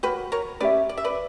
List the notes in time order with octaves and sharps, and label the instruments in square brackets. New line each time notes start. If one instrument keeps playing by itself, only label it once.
[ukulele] F#4 A#4 C#5 [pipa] G4 B4
[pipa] A#4 C#5
[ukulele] C#4 G4 C#5 E5 [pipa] B4 D5
[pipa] D5
E5
B4 D5